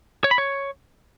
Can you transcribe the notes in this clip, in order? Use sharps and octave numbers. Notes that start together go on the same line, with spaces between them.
C#5
B5
C#5